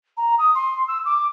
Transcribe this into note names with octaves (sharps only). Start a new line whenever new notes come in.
A#5
D#6
C6
E6
D6